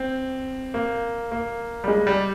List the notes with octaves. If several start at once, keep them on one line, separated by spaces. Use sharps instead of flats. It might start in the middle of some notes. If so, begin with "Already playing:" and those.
Already playing: C4
A#3
A#3
G3
G#3
G3